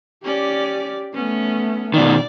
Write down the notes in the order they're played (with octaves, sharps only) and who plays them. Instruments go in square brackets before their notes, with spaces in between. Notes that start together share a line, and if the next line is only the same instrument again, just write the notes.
[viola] C#4 D5 [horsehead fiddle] G4
[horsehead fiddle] A3 B3 [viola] C#4
[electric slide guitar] B2 D#3 [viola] D5